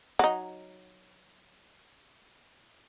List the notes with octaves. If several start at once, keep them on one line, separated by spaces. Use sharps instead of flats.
F#3 D#4